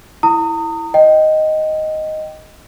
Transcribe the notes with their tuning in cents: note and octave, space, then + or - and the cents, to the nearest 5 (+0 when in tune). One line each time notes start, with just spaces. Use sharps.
E4 +0 A#5 -40 D#6 +0
D#5 +0 G5 -10